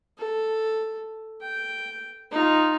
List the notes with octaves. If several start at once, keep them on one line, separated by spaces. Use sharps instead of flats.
A4
G5
D#4 F4